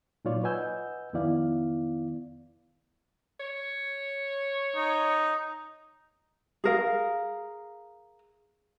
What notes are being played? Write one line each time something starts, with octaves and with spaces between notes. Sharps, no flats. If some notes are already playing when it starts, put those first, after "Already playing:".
A#2 F#3 D#4 F4 C#5 D5
B4 D#5 F#5 G#5 E6 G6
F2 D#3 B3 E4 D5 F5
C#5
D#4
G#4 A#4 F5